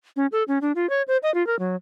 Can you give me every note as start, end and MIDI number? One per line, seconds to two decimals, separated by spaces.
0.16 0.27 61
0.32 0.43 69
0.48 0.58 61
0.62 0.72 62
0.75 0.89 65
0.90 1.02 73
1.08 1.17 72
1.23 1.33 75
1.34 1.45 65
1.47 1.58 70
1.59 1.76 54